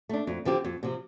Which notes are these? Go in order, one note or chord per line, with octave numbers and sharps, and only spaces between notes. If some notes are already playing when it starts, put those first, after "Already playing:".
A3 D4
F2
D3 F3 C4 G4
F2
C3 F3